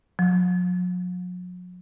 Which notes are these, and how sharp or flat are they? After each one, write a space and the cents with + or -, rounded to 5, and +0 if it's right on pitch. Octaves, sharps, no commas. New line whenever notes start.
F#3 -45